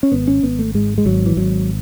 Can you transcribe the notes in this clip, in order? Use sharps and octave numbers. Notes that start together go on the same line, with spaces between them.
C#4
G#1 B3
C#4
G#1 B3
A3
G#2 G#3
G#3
G#1 F#3
E3
G#1 F#3